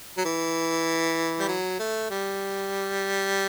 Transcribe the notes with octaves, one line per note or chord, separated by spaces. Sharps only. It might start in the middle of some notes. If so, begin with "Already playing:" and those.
F#3
E3
G3
F#3
A3
G3